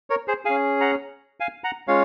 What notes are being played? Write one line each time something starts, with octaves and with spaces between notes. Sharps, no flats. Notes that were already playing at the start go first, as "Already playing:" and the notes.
A#4 C#5
G#4 C5
C#4 G#4 F5 G#5
F#5 A#5
F5 G#5
F#5 A#5
G#3 C#4 F4 C#5 F5